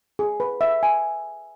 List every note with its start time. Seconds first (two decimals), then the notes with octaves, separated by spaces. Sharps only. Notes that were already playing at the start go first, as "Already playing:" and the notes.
0.19 G#4
0.40 B4
0.61 E5
0.83 G#5